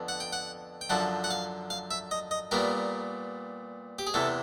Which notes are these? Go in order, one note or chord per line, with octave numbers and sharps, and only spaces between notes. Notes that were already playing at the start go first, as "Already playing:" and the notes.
Already playing: F2 D3 B3
F#5
G5
F#5
G5
F#2 D3 F3 F#5
F#5
F5
F5
E5
D#5
D#5
A#2 G3 B3 A#4
G4
G#4
E2 C3 E3 A4